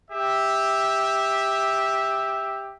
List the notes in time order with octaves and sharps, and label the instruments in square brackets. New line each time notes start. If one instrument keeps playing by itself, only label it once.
[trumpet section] G4 E5